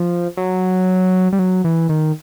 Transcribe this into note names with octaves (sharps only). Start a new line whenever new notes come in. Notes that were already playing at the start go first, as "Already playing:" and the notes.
Already playing: F3
F#3
G3
F#3
E3
D#3